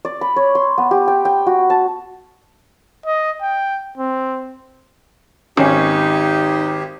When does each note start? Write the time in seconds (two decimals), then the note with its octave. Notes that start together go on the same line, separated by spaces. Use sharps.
0.05 D5
0.21 B5
0.36 C#5
0.55 C6
0.78 B3
0.91 G4
1.08 G5
1.25 G5
1.47 F#4
1.70 A5
3.06 D#5
3.42 G5
3.98 C4
5.57 G#1 C#4 D#4 G4